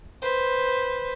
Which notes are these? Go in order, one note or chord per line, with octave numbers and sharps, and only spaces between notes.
B4 C5